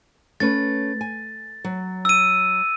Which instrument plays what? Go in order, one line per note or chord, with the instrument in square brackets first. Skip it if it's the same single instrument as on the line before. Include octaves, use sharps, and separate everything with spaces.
[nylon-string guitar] A3 C#4 B4 [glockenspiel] A6
[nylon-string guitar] G#5
F#3
[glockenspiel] E6 D#7